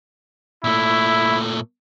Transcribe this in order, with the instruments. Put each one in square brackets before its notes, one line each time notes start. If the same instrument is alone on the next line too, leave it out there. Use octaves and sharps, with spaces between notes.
[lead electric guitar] A#2 A3 [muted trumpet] E4